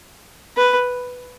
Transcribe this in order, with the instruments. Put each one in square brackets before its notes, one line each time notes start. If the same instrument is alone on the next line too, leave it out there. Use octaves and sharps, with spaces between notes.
[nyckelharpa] B4